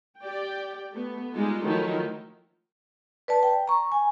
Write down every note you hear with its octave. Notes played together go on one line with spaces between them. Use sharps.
G4 D5 G5
A3 B3
G3 G#3 D#4 F4
D#3 F3 F#3 A3 D#4 E4
B4 D5 A5
G5
A#5 C#6
G#5